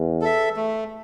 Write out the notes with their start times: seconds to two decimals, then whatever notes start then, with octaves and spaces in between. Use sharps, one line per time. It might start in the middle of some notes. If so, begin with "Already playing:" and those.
Already playing: E2
0.21 A4 E5
0.56 A3